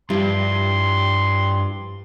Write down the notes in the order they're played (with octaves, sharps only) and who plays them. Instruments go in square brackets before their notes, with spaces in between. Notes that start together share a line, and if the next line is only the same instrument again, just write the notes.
[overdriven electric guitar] G2 [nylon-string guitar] F3 G3 E4 [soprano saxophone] C6